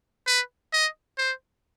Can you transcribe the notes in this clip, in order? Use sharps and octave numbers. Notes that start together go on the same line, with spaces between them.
B4
D#5
C5